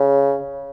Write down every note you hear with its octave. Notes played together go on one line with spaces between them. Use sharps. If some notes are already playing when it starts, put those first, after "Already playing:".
Already playing: C#3